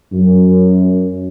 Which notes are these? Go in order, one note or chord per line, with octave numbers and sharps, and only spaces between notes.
F#2